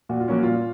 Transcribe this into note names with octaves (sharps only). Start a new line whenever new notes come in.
A#2 F#4
F4
F#3 A#3 C#4
A#2 F4